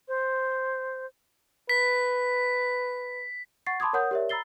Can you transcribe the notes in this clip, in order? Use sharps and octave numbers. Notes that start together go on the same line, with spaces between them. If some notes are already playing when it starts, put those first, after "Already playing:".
C5
B4 B6
F#5 C#6 A6 C7
A5 B5 C6 D6 D#6 G#6
A#4 C#5 F#5 D#6 G6
G4 A#4 C#5 D5 E5
A#5 B5 E6 A6 C7 G7